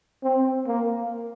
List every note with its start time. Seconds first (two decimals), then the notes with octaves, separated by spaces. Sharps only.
0.24 C4
0.67 A#3